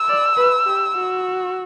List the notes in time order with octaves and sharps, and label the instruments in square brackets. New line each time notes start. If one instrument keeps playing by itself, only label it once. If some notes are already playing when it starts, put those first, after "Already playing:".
Already playing: [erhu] E6
[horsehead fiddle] D5
B4
G4
F#4